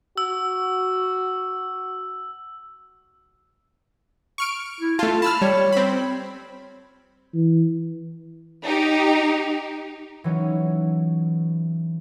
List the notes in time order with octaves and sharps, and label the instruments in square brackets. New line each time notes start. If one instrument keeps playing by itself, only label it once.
[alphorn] F#4 [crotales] E6
[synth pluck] C#6 F6 D7
[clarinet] E4
[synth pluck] A3 F4 [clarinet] A5
[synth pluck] A5 E6 F6 [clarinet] B5
[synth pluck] G3 [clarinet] C#5
[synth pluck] C4 B5
[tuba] E3
[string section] D#4 G4
[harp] E3 F#3 C#4 D#4